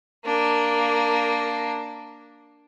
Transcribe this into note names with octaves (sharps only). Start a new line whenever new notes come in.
A#3 D4